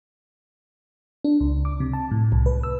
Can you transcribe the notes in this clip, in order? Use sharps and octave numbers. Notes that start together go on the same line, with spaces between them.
D4
C#2
D6
C3
A5
A2
C2
B4
E6